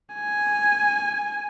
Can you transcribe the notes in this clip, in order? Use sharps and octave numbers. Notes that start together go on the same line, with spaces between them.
G#5